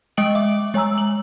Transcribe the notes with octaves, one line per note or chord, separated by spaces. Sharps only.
G#3 D#5 G5 D#6 D7 F#7
E5 D6
G#3 C#5 G#5 A#5 E6
F#7